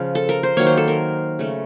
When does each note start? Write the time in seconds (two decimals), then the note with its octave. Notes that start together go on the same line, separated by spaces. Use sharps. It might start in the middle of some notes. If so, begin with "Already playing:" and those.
Already playing: C#3 F3
0.15 A4
0.29 A#4
0.43 C5
0.57 D#3 F#3 A#3 C#5
0.66 C5
0.77 A4
0.88 A#4
1.39 C#3 A3